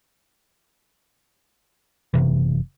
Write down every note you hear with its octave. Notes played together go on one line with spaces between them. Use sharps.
F#1 C2 C3 E3